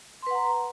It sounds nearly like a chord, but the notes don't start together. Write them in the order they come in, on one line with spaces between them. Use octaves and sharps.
C6 B4 F#5 A#5